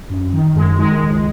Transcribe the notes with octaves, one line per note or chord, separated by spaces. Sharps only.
F#2
D#3
F#2 G#3
D#3 G#3
C#2